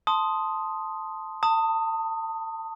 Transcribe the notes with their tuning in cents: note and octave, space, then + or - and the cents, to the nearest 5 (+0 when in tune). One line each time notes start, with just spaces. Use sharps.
A5 +0 C6 +0 D#6 +0
A5 +35 D#6 +0